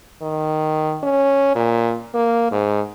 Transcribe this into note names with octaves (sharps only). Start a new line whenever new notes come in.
D#3
C#4
A#2
A#3
G#2